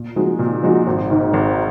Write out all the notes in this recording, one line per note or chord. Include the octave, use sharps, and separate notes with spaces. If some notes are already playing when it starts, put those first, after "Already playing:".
Already playing: A#2
F3 G#3 D#4 F#4
A#2
F3 G#3 D#4 F#4
G#1
G#2 D#3
G#1